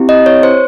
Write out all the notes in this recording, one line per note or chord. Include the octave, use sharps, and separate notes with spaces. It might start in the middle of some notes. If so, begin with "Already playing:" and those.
Already playing: C4 E4 G4
D#5
C#5
C5